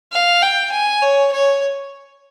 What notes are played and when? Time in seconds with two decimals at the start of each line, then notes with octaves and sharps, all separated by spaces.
0.13 F5
0.42 G5
0.72 G#5
1.02 C#5
1.32 C#5